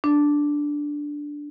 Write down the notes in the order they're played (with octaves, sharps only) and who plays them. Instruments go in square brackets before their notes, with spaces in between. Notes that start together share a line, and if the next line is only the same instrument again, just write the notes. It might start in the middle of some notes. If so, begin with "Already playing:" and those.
[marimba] D4